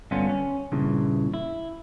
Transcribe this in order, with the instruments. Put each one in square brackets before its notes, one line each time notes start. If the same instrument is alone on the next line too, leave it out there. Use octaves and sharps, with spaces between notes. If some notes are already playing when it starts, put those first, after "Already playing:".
[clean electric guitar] G2 D3 B3 C#4 F4
C#4
G2 A#2 C#3 E3
E4